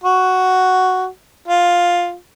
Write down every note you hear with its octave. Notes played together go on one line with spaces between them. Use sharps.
F#4
F4